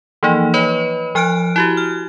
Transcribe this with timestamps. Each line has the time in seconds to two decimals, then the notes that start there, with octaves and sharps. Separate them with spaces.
0.23 E3 F3 A#3 D#4
0.54 B4 C#5 D#5 B5
1.15 F3 G#5 F6 F#6 D7
1.56 E4 F#4 G4
1.77 F6